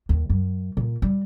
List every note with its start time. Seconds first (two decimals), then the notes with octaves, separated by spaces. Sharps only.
0.09 D#2
0.30 F#2
0.77 A#2
1.02 G3